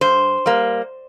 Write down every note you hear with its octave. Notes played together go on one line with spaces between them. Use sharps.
G2 C5
G3 A#3